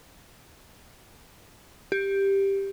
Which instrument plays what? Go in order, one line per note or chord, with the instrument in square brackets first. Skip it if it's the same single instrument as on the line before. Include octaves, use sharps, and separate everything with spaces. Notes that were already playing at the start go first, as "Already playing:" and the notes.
[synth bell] G4